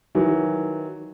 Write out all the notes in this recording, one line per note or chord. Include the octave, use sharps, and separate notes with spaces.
D#3 E3 F#3